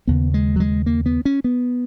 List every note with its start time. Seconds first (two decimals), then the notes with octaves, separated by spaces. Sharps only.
0.07 D#2 C#3 B3
0.34 G#3
0.56 F#3
0.60 G#3
0.86 A#3
1.06 B3
1.25 C#4
1.44 B3